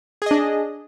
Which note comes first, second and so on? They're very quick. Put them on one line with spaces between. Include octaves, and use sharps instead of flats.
G#4 D#5 D4